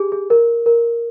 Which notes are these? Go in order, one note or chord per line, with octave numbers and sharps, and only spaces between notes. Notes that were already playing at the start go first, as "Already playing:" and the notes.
Already playing: G4 G#4
G#4
A#4
A#4